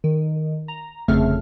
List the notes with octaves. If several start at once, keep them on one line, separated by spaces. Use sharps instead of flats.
D#3
A#5
G1 F2 C#3 A3 F6